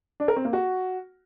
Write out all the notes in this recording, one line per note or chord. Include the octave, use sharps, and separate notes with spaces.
D4
A#4
C4
A#3
F#4